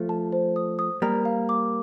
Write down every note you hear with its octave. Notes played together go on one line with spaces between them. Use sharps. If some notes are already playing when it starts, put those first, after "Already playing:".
Already playing: F3 A3
A5
C5
D#6
D#6
G3 A#3 A#5
F5
D6